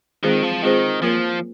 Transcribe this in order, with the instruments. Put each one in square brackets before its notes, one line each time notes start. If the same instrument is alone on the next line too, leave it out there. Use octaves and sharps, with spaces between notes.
[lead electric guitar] D#3 [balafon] G#3 C4 F4 G#4 C5
[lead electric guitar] F3
[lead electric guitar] D#3 [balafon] G#3 C4 F4 G#4 C5
[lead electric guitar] F3 [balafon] A#3 F4 A#4 C#5